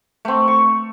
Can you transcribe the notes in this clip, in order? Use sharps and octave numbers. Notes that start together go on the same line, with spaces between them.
A3 C4
C#6